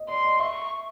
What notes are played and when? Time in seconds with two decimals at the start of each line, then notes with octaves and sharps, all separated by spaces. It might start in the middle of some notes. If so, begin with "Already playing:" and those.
Already playing: D#5
0.08 D5 C6
0.25 D#5
0.40 E5 C#6